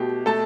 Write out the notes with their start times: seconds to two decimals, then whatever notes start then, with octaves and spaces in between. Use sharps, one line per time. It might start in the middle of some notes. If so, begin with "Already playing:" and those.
Already playing: B2 A3 G4
0.26 A3 A4 A5